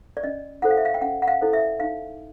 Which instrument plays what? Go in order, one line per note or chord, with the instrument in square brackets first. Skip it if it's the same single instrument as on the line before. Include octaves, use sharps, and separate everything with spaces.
[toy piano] D5
C#4 D#5
E4 A4 C5 F#5
F5
E5
F5
G5
C#4 F#5
F#5
F5
E4 A4 C5
E5
D#4 F5